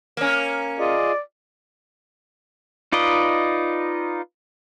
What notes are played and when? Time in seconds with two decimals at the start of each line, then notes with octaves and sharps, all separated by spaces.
0.17 A#3 C#4
0.79 F4 G#4 D5 D#5
2.92 D#4 F4 B4 D5 D#5